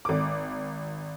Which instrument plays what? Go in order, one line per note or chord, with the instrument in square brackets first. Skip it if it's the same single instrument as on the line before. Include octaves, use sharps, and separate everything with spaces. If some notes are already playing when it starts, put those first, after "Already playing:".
[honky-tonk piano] G#1 D6